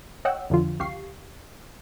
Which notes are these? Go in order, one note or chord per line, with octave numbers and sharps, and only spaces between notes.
C#5 D#5 F#5 G5 E6
F2 D3 F3 F4
C#2 G4 F5 C#6 C7